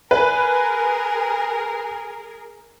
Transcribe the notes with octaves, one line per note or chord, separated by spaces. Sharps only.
G#4 A#4 B4 G#5